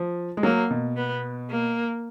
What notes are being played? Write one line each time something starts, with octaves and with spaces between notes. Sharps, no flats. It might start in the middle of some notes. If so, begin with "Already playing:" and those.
Already playing: F3
G#3
F#3 A#3
B2
B3
A#3